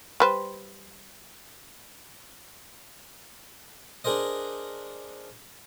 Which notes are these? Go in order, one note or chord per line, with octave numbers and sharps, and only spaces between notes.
G3 B4 C5
D4 G#4 A#4 C5 D#5